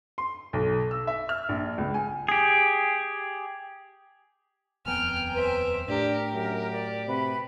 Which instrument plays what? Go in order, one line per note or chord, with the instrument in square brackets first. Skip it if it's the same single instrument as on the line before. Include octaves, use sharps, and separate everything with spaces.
[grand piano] C6
B1
E6
E5
F6
A#1
C#2
G#5
[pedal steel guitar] G4 G#4
[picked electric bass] D#1 F2 B3 [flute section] G5 G#5 A#5 [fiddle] F6
[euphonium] B4 [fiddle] C5 E5
[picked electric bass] A2 [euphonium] D4 [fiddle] G4 [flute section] A#4
[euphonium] F#2 [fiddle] G4
[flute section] D5
[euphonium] C3 [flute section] F#4 B4